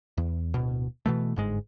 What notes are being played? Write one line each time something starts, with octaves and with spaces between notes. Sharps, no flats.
E2
D1 B2
B2 E3 A3
G1 G#2 G#3